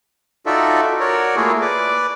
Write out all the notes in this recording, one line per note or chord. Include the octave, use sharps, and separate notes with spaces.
D#4 F4 F#4 A4 D5 E5
F#4 A#4 C#5 D5
A3 A#3 E4 F4 G#4
B4 D5 D6